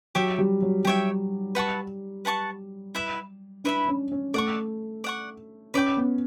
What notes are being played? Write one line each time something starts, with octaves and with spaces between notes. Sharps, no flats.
F#3 G4 C#5 E5 G5
G3
F#3
G3 G4 C#5 E5 G5
B4 F#5 A5 C#6
B4 F#5 A5 C#6
E4 B4 E5 B5
D4 E4 B4 E5 B5
C#4
C#4
A3 D5 F#5 C#6
D5 F#5 C#6
C#4 B4 D5 G5 D6
B3